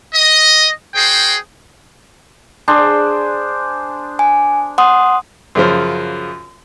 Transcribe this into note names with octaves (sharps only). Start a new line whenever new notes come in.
D#5
F#4 G#4 C5 G5
D4 G#4 C5
G#5
F#5 C6 D#6
F#2 C#3 F3